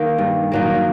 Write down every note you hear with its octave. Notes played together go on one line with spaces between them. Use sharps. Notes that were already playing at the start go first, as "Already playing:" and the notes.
Already playing: D#3 A#3
G2
D#3 F#3 A#3